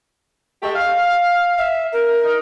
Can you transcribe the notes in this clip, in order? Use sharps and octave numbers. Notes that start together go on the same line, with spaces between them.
G#3 A3 G4
F5
E5
A#4
D#4